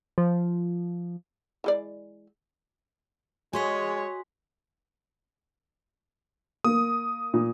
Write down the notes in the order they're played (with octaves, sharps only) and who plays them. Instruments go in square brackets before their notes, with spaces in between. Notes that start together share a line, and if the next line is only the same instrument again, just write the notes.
[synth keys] F3
[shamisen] E3 G#3 D5
[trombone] G#3 [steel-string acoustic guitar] F#4 G#4 D#5 [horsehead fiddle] C#5 [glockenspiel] G#5 C6 B6
[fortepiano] A#3 [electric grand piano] D#6
[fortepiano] A#2